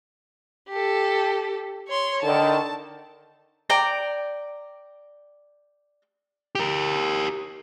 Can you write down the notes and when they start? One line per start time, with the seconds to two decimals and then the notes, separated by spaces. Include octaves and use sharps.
0.69 G4 A4
1.88 C#5 C6
2.23 D3 D#3 A5
3.70 D5 G5 A#5
6.55 G4 A#4